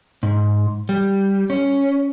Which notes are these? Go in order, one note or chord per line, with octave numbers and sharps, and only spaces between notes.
G#2
G3
C#4